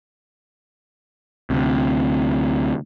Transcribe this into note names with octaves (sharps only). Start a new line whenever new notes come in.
D2 C3